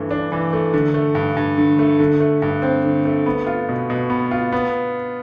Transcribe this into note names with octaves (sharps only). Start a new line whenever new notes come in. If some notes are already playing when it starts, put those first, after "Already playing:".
Already playing: G2 E3 A3
D4
E3
A3
D3
A3
G2
G2
D3
A3
D3
A3
G2
C4
D3
A3
B3
F4
B2
B2
B3
F4
B3